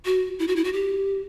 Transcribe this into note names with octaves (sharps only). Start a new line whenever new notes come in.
F#4
E4
F#4
E4
F#4
G4